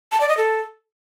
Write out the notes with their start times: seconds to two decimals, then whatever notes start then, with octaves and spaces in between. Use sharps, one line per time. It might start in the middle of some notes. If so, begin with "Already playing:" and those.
0.12 A5
0.20 D5
0.29 D#5
0.37 A4